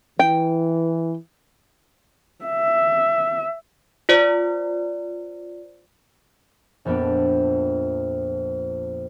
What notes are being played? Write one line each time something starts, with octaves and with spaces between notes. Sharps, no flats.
E3 G5
E5
F4 C5 D5
A#1 F2 B3 D4 D7